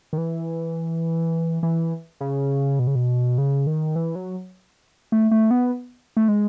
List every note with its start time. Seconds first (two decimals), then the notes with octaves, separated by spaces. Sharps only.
0.13 D#3
0.18 E3
1.63 E3
2.21 C#3
2.79 B2
2.87 C#3
2.95 B2
3.38 C#3
3.67 D#3
3.96 E3
4.15 F#3
5.12 A3
5.31 A3
5.51 B3
6.17 A3
6.28 G#3